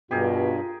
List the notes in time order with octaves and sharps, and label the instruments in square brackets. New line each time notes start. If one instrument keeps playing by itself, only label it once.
[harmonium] G2 [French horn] B2 [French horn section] F4 [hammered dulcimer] G4 G#4 A#4